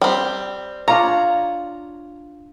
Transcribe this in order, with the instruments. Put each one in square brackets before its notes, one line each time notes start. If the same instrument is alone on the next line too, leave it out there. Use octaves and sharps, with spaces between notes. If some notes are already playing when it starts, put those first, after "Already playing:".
[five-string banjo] G3 C4
[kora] D4 F4 C#5 [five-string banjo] A#5